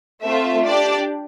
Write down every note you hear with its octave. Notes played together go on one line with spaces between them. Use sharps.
A3 C4 F4 E5
D4 G4 D5